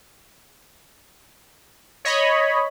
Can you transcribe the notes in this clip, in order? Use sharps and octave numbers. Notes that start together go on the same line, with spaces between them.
C#5 D#5 B5